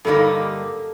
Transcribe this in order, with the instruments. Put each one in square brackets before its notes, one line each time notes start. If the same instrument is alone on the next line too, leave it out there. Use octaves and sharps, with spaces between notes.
[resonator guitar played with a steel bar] G2 D3 G3 A#3 D#4 [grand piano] A4